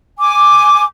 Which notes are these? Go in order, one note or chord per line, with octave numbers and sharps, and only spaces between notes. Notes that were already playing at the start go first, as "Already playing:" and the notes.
G#5 D6